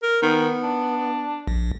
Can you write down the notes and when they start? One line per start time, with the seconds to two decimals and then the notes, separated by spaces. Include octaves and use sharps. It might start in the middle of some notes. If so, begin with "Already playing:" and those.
0.03 A#4
0.22 D#3 B3
0.63 D4
1.48 A#1